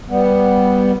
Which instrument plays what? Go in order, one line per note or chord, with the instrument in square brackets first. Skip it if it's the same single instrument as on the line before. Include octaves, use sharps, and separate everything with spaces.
[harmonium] G3 B3